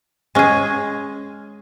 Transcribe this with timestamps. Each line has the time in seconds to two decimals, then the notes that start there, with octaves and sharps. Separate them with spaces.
0.35 G#3 C#4 G#4